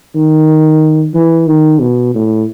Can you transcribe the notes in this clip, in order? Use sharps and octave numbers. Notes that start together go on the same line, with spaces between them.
D#3
E3
D#3
B2
A2